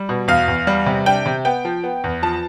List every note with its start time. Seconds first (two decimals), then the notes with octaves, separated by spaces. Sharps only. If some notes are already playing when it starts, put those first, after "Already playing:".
Already playing: G3
0.09 B2
0.28 E2 F5
0.48 E2
0.67 G3
0.86 C3
1.06 D4 G5
1.26 C3
1.45 B3 G5
1.65 F3
1.83 B3
2.04 E2
2.23 F3 A5